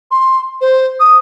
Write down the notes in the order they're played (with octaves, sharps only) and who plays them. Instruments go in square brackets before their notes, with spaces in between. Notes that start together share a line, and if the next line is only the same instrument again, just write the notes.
[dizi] C6
C5
D#6